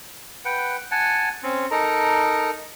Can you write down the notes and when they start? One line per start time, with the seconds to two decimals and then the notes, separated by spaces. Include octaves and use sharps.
0.45 B4 F#5 G5
0.91 F#5 G#5 A5
1.43 C4 C#4
1.71 D#4 A4 A#4 A#5